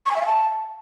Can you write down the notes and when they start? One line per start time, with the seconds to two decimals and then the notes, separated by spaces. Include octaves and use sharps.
0.06 C#6
0.11 G#5
0.16 E5
0.21 F5
0.26 A5